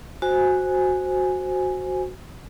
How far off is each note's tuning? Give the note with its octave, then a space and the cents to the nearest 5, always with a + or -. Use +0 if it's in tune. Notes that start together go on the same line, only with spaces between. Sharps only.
F#4 +0 C5 +0 G#5 +0